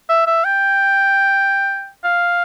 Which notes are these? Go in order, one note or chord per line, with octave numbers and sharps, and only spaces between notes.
E5
E5
G5
F5